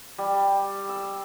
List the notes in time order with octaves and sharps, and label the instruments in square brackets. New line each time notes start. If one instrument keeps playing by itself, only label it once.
[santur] G3
E6